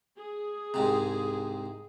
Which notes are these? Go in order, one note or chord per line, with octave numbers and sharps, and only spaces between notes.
G#4
C2 G#2 C3